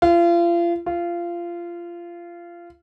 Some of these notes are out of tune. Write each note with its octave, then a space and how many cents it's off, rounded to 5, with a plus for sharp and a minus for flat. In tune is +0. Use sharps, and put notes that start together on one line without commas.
F4 -35
F4 -20